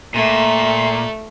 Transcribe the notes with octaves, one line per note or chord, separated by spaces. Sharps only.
A#2 A3